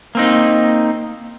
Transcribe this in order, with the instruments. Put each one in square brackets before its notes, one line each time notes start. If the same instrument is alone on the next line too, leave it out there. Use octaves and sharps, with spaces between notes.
[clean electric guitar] A#3 C4 D#4